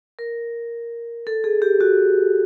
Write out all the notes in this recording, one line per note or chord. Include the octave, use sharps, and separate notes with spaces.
A#4
A4
G#4
G4
F#4